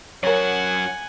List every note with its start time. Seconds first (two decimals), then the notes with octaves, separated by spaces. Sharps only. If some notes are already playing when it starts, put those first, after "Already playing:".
0.23 F#2 F#4 A#4 C#5 F#5 G#5